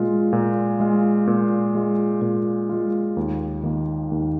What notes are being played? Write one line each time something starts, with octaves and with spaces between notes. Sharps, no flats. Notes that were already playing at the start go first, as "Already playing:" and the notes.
Already playing: A#2 G#3 F4
A#2
G#3 F4
A#2
G#3 F4
A#2
G#3 F4
D#2
D#3 A#3
D#2